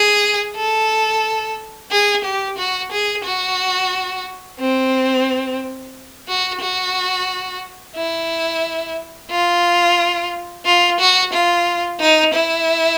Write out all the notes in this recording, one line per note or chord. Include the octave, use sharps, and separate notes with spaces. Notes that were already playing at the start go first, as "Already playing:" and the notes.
Already playing: G#4
A4
G#4
G4
F#4
G#4
F#4
C4
F#4
F#4
E4
F4
F4
F#4
F4
D#4
E4